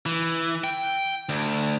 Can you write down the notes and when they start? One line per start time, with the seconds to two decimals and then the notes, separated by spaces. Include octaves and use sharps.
0.06 E3
0.64 G5
1.29 D2